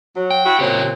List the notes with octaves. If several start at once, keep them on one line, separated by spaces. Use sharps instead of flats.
F#3
G5
E4 F#4
A#2 C#3 F#3 C4 G4